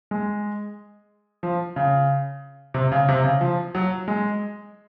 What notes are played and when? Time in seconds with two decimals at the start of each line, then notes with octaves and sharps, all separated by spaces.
0.11 G#3
1.43 F3
1.76 C#3
2.74 C3
2.92 C#3
3.09 C3
3.24 C#3
3.41 F3
3.75 F#3
4.08 G#3